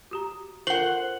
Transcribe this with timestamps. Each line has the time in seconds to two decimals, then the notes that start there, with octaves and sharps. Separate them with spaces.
0.11 F#4 G4 A#5
0.67 F4 A4 A#4 C5 F#5 F#7